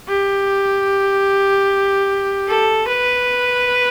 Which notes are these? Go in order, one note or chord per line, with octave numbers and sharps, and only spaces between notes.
G4
A4
B4